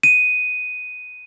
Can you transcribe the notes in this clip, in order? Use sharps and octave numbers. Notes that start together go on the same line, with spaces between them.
D#7